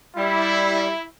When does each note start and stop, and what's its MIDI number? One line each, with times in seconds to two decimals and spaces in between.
0.17 0.89 55
0.17 1.03 64